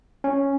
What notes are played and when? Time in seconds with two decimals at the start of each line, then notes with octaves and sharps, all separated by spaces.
0.24 C#4